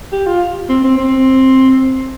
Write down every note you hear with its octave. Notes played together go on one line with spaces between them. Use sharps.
G4
F4
C4
C4
C4